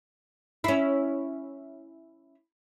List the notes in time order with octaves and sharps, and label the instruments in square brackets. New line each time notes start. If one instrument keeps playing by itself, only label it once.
[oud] C#4 E4